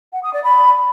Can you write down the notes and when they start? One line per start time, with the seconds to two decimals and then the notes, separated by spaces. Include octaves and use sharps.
0.13 F#5
0.23 D#6
0.34 D5
0.44 B5